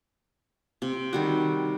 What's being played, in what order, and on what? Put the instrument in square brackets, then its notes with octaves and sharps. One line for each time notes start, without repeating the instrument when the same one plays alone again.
[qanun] C3
D#3 G3 F#4